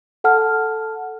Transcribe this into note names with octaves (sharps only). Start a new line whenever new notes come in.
A4 F#5 A5 F6